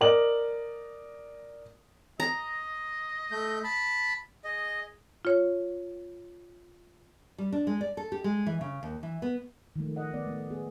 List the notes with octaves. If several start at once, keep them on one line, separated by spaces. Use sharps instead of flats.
A#4 D5 D#5 F#7
D#5 A#5
A3 G6
A5 B5
G#4 D#5
F4 C#5
G3
D4
G#3
D5
A4
G4
G#3
E3
C#3
D#2
E3
B3
D#3 F3 A3
D#5 F#5
B3 D5
A3 B3
B3 G#4